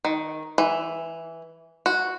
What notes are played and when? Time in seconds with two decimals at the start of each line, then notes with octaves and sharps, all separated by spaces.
0.05 D#3
0.58 E3
1.86 F#4